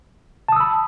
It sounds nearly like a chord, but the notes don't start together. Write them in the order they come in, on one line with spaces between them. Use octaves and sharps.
A5 D#6 E6 B5